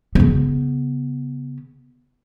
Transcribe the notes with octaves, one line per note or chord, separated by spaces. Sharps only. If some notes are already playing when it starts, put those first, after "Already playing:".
C#3 B3